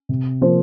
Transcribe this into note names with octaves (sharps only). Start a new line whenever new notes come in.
C3
F3 A#3 F4 C5